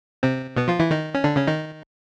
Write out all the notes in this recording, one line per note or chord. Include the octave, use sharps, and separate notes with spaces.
C3 C4
B2 B3
F3 F4
E3 E4
D#3 D#4
C#4
D3 D4
C#3 C#4
D#3 D#4